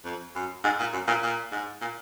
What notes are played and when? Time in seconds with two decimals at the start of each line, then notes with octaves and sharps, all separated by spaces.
0.04 F2
0.35 F#2
0.64 G#2
0.79 A#2
0.93 F#2
1.07 A#2
1.23 A#2
1.52 G#2
1.81 A#2